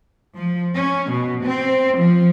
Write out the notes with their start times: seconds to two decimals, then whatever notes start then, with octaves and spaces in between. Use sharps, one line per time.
0.37 F3
0.75 C#4
1.11 B2
1.45 C4
1.98 F3